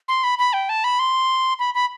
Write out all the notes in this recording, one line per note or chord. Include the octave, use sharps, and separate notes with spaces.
C6
B5
B5
G5
A5
B5
C6
B5
B5